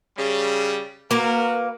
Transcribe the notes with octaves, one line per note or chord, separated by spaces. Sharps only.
C#3 G3
A#3 F#4 A#4 B4